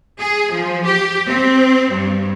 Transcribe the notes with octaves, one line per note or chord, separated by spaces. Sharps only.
G#4
F3
G4
C4
G2